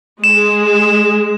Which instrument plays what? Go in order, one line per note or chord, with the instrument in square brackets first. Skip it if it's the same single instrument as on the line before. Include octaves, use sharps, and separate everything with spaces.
[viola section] G#3 G#4 [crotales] E7